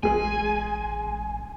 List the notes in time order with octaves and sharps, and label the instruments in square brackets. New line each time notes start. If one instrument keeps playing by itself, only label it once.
[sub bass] A1 [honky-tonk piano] G#3 G#4 [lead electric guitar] G#5